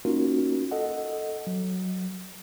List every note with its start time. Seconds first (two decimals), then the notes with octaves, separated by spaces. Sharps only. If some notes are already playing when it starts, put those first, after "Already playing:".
0.05 A#3 C#4 D#4 F4 F#4 A#4
0.71 A4 D#5 F#5
1.47 F#3